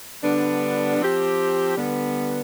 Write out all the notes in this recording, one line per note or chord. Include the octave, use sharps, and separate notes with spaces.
D3 G3 B3 D4
F3 C4 G4
D3 G3 B3